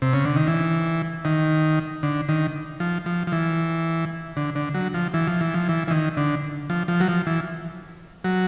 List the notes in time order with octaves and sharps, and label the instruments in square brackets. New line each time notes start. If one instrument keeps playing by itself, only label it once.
[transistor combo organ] C3
C#3
D3
D#3
E3
D#3
D3
D#3
F3
F3
F3
E3
D3
D3
F#3
F3
E3
F3
E3
F3
E3
E3
D#3
D3
F3
F3
F#3
F3
E3
F#3